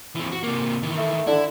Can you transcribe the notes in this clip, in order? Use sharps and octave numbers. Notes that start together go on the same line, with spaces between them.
E3 C4
F#4
C3 A#3
D#3 E3
A3
D3 E4